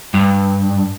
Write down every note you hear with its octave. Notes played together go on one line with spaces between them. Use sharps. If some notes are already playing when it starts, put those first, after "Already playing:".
G2